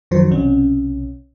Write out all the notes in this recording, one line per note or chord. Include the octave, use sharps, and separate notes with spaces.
F#2 D#3 F3 F#3 C5
B1 C3 C#4